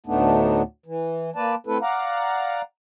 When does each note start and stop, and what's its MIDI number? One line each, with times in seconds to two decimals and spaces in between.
0.06 0.62 38
0.06 0.62 45
0.06 0.62 57
0.06 0.62 59
0.06 0.62 62
0.06 0.62 63
0.86 1.30 52
1.36 1.55 58
1.36 1.55 71
1.36 1.55 74
1.36 1.55 81
1.67 1.78 57
1.67 1.78 60
1.67 1.78 64
1.67 1.78 69
1.67 1.78 71
1.82 2.62 74
1.82 2.62 77
1.82 2.62 78
1.82 2.62 82